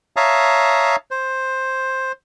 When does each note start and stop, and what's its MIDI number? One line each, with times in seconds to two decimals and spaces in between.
0.16 0.96 73
0.16 0.96 76
0.16 0.96 77
0.16 0.96 81
0.16 0.96 82
0.16 0.96 87
1.11 2.12 72